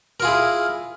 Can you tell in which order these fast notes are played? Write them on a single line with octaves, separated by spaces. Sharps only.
A#4 F4 G#4 E4